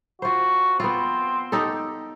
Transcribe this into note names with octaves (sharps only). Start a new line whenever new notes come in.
F4 F#4 C5
B3 C4 F4
D#4 G4 A4